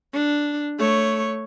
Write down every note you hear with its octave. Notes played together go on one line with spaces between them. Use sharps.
D4
A3 C#5